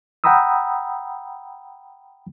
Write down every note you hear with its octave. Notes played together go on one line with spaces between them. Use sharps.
F#5 G5 A#5 B5 D#6 E6